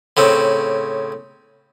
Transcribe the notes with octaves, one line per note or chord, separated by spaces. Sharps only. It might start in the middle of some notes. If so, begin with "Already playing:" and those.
A2 C#3 C4